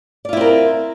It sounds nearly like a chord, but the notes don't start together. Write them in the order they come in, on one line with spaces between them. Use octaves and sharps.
D5 F4 E4 C4 A#4